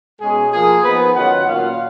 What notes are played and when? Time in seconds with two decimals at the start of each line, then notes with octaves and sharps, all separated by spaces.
0.20 B2 G#3 C#4 G#4
0.51 F3 A#3 F4 G#4
0.83 F3 B3 D#4 B4
1.14 D#3 F#3 C#4 F4 F#5
1.46 A#2 F#3 C#4 F4 F5